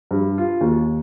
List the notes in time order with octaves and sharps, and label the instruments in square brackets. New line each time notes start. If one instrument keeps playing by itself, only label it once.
[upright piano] G2
F4
D#2